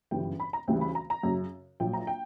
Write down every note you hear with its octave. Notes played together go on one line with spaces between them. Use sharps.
G1 F#2 C#3 E3 G3 G5
B5
A#5
D2 C#3 E3 G3 G5
B5
A#5
A#5
F#2 C#3 F#3
A#1 A#2 F#3 G5
A#5
G5